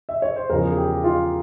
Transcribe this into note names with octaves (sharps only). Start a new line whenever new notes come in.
E5
C#5
C5
E2 C#3 F3 A#4
G#4
G4
F4